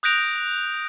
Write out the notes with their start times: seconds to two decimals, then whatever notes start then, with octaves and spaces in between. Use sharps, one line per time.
0.03 D#6 F#6 G6 A#6 D7 F7